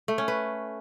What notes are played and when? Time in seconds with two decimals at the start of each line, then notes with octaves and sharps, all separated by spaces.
0.08 A3
0.18 C#4
0.28 B4